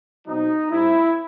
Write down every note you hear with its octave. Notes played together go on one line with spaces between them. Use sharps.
B2 F#3 C4 D#4
A2 G3 C4 E4